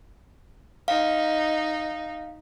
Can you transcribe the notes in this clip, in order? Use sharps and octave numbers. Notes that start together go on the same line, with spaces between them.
D#4 F5